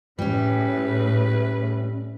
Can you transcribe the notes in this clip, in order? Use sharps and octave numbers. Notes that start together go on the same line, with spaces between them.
A2 G3 C#4 B4